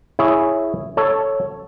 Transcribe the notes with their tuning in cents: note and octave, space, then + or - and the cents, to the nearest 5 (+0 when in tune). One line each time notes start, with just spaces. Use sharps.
E4 +0 G#4 +0 C#5 +0
A4 +0 C#5 +0